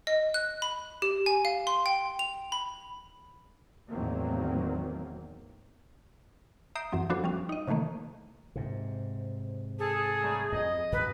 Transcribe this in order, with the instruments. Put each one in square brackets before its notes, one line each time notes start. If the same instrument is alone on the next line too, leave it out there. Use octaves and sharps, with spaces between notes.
[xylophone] D#5
F#6
B5
G4
G#5
F5
C6
G5
F7
B5
[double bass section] E2 A2 D#3 F#3 A#3 C4
[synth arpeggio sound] E5 A#5 D#6 G6 C7 D7
F#2 E3 F#3 C4
F3 B3 D4 F#4 A4 C5
F3 G3 C#4 F5
D#4 D#5
C3 D#3 E3 A3 A#3
[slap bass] G#2 C3
[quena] G#4 [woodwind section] A4 A5
[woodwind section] F#3 G3 A3
[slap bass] F2 [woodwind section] D#5
[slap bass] B1 G2 A#2 [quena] B4